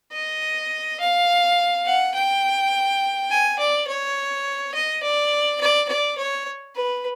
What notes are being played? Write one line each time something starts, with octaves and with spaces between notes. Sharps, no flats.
D#5
F5
F#5
G5
G#5
D5
C#5
D#5
D5
D5
D5
C#5
B4